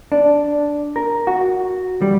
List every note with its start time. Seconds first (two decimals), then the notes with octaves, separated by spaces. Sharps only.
0.12 D4
0.96 A#4
1.27 F#4
2.02 G3